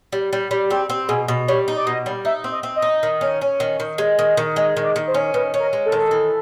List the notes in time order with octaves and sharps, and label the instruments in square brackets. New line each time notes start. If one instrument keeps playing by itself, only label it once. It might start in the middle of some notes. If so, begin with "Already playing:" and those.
[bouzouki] G3
G3
G3
[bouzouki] C4 [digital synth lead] G4
[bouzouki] C4
[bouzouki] B2 [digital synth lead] G#4
[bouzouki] B2
[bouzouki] G3 [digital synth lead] C#5
[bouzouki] D#4
[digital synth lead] D5
[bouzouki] B2 [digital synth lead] D#5
[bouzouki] G3
[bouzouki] D#4 [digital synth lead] E5
[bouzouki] C4
[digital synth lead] D#5
[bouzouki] C4
[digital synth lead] D#5
[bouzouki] D#4
D#3
C#4
C#4
D#3
D#3
G#3
D#3
D#3
[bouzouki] G#3 [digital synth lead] D#5
[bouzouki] D#3
[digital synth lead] D5
[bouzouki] D#3
[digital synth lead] C5
[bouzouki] C#4
[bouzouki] D#3 [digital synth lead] B4
[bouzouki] C#4
[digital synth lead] A#4
[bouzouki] G#3
[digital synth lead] A4
[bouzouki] D#3
E3